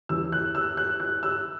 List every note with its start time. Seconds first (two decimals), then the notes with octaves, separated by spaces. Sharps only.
0.09 E2 E3 E6
0.32 F#6
0.55 E6
0.77 F#6
1.00 F#6
1.23 E6